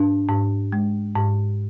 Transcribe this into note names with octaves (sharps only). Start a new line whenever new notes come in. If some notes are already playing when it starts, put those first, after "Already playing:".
Already playing: G#2 D4
G#2
G#3
G#2